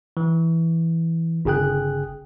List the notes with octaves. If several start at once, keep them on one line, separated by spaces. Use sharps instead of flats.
E3
G1 C#3 G#4 G5 F#6